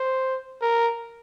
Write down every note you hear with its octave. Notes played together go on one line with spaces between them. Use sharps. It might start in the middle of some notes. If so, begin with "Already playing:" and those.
Already playing: C5
A#4